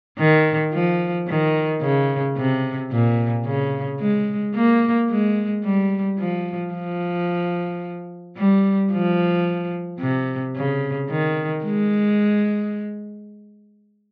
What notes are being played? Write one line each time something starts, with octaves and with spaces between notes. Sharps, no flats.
D#3
F3
D#3
C#3
C3
A#2
C#3
G#3
A#3
G#3
G3
F3
F3
G3
F3
C3
C#3
D#3
G#3